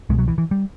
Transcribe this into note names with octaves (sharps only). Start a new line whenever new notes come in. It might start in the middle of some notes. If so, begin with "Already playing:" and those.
C2 B2 G#3
F#3
E3
E3
G3